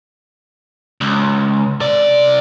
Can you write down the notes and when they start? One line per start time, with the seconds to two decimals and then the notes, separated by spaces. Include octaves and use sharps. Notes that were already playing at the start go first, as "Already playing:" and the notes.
1.01 C#2
1.80 C3 D5